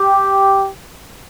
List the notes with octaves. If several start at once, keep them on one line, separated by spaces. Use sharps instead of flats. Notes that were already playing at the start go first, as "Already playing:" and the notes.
Already playing: G4